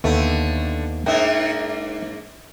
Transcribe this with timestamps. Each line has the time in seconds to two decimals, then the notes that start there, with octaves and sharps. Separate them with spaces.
0.04 D#2 D3 A3 B3 A4
1.06 G#2 A#3 D4 E5 G5